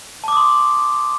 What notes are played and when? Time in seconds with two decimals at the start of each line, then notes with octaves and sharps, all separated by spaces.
0.24 A5
0.28 D6
0.33 D#6
0.37 C6